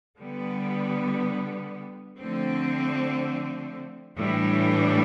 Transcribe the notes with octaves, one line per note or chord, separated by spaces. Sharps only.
D3 G3 B3
D3 F3 A3 C4
A2 E3 G3 D4